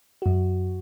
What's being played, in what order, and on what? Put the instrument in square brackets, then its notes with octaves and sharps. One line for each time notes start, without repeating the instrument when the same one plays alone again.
[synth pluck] F#2 F#4